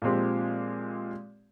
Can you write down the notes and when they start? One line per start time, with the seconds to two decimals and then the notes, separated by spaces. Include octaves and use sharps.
0.02 A#2 F3 G#3 C4 G4